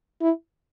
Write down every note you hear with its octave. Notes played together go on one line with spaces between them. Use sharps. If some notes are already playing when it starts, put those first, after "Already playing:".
E4